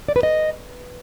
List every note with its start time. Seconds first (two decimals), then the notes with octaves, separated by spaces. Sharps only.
0.08 D5
0.16 B4
0.23 D#5